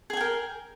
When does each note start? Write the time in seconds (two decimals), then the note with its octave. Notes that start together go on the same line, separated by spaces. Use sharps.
0.10 G#4
0.13 G#5
0.17 G5
0.21 A#4